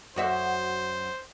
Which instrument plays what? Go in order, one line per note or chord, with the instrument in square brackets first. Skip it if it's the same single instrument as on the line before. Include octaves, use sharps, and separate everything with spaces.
[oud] F#2 F#4 E5 [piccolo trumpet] C5